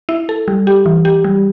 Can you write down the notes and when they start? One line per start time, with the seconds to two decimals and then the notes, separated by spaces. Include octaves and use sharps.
0.09 E4
0.29 A4
0.48 G3
0.67 G4
0.86 E3
1.05 G4
1.24 G3